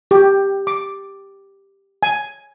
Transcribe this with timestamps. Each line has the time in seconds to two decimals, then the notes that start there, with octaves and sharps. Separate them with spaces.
0.11 G4
0.67 D6
2.03 G#5